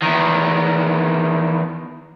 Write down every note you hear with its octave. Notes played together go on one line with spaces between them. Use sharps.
E2 D#3